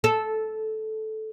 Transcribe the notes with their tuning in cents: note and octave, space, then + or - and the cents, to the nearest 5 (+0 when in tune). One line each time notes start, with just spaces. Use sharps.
A4 -10